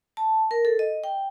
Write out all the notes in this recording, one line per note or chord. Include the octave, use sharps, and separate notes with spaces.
A5
A#4
A4
D#5
G5